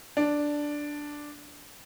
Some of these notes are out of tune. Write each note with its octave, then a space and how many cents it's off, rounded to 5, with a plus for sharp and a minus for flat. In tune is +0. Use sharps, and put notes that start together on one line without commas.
D4 +0